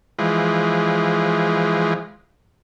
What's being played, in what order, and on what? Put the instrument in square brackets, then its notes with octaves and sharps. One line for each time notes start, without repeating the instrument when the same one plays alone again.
[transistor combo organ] E3 F3 G#3